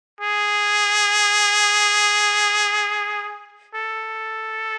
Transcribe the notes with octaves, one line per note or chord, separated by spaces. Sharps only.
G#4
A4